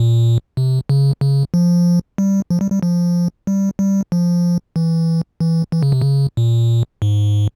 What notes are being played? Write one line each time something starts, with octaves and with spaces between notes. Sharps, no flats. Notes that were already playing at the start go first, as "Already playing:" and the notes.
Already playing: A#2
C3
C#3
C#3
F3
G3
F3
G3
G3
F3
G3
G3
F3
E3
E3
E3
C#3
C3
C#3
A#2
G#2